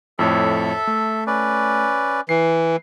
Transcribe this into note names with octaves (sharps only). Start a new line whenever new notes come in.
F2 A2 A4 C#5 E5
A3
C#4 B4 D5
E3 C7